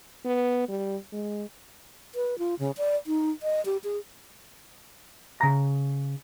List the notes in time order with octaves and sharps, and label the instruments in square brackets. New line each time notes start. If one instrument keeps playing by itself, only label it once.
[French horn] B3
G3
G#3
[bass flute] B4
F4
C#3
D5
D#4
D#5
G4
G#4
[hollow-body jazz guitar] C#3 A#5